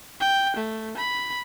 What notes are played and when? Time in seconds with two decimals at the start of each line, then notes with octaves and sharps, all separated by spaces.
0.20 G5
0.56 A3
0.97 B5